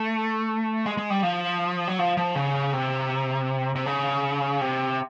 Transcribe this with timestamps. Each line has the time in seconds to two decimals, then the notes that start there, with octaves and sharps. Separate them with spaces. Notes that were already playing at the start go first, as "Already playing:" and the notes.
Already playing: A3
0.86 G#3
0.97 G#3
1.10 G3
1.23 F3
1.88 F#3
1.99 F3
2.17 F3
2.35 C#3
2.73 C3
3.75 C3
3.86 C#3
4.61 C3